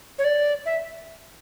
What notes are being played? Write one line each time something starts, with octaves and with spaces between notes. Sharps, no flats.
C#5
D5
E5